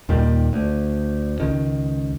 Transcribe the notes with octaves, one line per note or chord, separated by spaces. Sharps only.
D#2 A#2 D#3 G3
D2
C#2 D#3